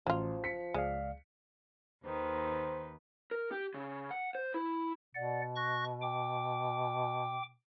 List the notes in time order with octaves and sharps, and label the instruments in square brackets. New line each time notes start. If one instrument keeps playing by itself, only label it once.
[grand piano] A1 [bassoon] F3 [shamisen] F#3 F4
[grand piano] B6 C#7
[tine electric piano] C#2 D5 F5 [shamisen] G#3
[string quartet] D#2 D#3 B4 [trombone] C5
[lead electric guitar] A#4
G4
C#3
F#5
C5
E4
[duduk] B2 [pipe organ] D5 F#5
[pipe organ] C#6 F#6 A#6
G5 D6